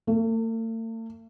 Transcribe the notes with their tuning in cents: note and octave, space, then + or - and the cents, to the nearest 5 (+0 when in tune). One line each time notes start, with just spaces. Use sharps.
A3 +45